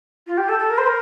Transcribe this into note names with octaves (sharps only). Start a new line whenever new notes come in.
F4
G4
A4
A4
A#4
C5
A#4